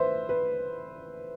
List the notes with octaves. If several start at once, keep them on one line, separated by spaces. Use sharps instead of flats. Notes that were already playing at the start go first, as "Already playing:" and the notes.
Already playing: B4 C5 E5
B4